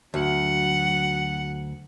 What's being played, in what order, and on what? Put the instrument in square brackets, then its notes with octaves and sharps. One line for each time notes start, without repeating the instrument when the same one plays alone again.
[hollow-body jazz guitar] D2 [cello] F#3 F#5